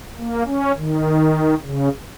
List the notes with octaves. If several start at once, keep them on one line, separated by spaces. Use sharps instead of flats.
A#3
C#4
D#3
C#3